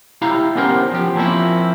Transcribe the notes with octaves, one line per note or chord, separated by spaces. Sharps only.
E4 G4 F5 A#5
B3 C#4 G4 A#4 C5
F3 G4
F3 A#3 C4 C#4 E4